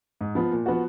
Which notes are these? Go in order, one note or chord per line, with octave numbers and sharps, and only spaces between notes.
G#2
F3 B3
A#2
F3 B3 F#4